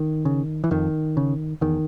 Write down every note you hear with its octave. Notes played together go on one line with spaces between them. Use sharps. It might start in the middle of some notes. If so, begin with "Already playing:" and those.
Already playing: D#3
C#3
E3
F2 D#3
C#3
E2 D#3